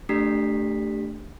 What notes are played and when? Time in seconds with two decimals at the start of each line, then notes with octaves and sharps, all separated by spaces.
0.09 A3 D4 G4 B6